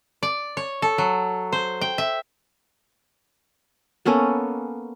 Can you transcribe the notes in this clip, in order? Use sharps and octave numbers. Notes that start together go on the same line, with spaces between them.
D5
C#5
A4
F#3
C5
G5
E5
A#3 B3 C#4 A4